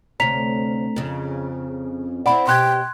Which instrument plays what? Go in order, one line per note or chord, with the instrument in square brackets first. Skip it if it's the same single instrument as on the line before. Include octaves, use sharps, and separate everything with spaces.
[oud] D2 C3 C#5 [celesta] A#5 B6 F7
[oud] F2 C#3
[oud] C4 E4 D5 [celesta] F#5 B5
[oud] B2 G4 [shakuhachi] G5 [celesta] C6 F#6 G#6